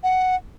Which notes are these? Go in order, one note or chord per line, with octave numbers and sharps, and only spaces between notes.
F#5